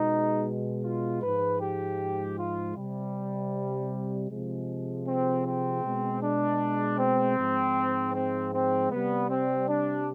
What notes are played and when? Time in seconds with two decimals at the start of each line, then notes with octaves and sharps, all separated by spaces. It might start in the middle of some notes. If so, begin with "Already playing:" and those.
Already playing: B2 G#3 D#4
0.84 F4
1.22 G#2 F3 G#3 B4
1.61 G4
2.38 F4
2.76 C3 G3
4.30 C3 F3 G#3
5.07 C4
5.45 C4
5.83 B2 G#3
6.22 D4
6.99 C4
7.37 G#2 F3 G#3
8.14 C4
8.52 C4
8.91 C3 G3 B3
9.29 C4
9.68 D4